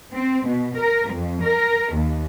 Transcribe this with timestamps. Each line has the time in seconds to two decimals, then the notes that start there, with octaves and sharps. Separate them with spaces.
0.14 C4
0.48 B2
0.78 A#4
1.12 F2
1.44 A#4
1.95 D#2